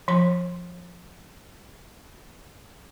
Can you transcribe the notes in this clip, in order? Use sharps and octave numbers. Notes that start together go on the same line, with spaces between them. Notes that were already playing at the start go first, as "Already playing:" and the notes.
F3 C6